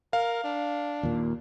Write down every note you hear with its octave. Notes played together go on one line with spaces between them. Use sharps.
A#4 F5
D4
D#2 A#2